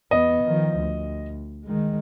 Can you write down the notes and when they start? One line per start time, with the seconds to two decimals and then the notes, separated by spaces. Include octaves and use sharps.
0.11 E2 B3 D#5
0.44 D#3 F3
0.78 D2
1.65 D#3 G#3